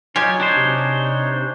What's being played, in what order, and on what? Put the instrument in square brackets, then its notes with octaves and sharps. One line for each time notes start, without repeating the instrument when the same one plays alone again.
[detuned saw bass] F#3 [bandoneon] D#4 C#5 [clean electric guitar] F4 G4 [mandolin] G#5
[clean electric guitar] D4 C5
[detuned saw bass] C3